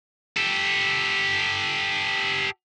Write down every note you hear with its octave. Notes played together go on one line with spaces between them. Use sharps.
G4 A4